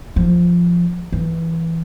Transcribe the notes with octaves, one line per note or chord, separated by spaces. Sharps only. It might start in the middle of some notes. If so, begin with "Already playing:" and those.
F3
E3